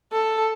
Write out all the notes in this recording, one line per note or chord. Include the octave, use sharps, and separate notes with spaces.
A4